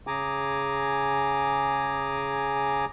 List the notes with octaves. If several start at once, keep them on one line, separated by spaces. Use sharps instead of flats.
C#3 G#4 G#5 A#5 D6